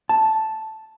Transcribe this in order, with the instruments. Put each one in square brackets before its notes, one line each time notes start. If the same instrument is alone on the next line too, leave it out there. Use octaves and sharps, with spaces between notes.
[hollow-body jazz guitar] A5